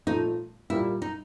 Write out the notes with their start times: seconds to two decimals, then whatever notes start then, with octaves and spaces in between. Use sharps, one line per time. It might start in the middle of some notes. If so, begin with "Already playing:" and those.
0.07 A#2 F3 A3 D#4
0.70 A#2 G3 A#3 E4
1.02 D#4